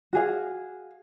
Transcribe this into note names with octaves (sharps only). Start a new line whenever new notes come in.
F#4 G#4 F5